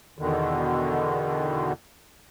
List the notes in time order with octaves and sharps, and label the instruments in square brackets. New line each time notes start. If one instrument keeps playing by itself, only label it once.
[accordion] E2 B2 D3 D#3